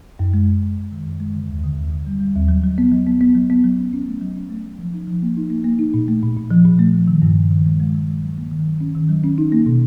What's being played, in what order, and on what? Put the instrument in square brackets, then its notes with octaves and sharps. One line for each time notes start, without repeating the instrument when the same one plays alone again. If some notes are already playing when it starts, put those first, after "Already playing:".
[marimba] F#2
G#3
F#2
F#2
F#2
D#3
F#2
G#3
D3
D#2
D3
D#2
D3
G3
G3
D#2
F#3
F#3
B3
F#3
B3
B3
F#3
B3
F#3
C#4
C#4
A3
F#3
C#4
A3
F#3
F3
D#4
F3
A#3
D#4
A#3
A#3
D#4
A#2
A3
A#2
A#2
F3
A#2
A3
F3
D#3
G2
G2
D#3
G#3
G#3
D#3
G#3
F#3
A#3
D#3
F#3
C#4
D#3
F#3
C#4
D#4
A#3
B2